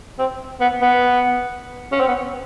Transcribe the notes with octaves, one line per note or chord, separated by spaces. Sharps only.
C4
B3
B3
C#4
C4
B3